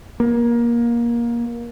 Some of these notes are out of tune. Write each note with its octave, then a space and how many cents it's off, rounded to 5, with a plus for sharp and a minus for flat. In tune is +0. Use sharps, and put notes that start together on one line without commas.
A#3 +20